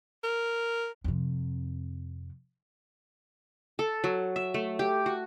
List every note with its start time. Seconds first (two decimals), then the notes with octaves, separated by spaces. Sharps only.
0.23 A#4
1.04 F2 C3
3.79 A4
4.04 F#3
4.36 E5
4.54 A3
4.79 G4
5.06 F#4